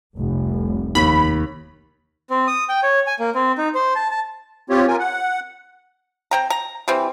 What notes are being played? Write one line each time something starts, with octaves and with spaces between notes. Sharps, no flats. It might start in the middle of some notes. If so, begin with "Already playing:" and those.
F1 C2
D#2 B5
C4
D#6
G5
C#5
G#5
A#3
C4
D#4
C5
A5
A5
C4 F4 G4 C#5
F4 A#4 G#5
F#5
C4 G5 A#5
A#5
E3 G3 C4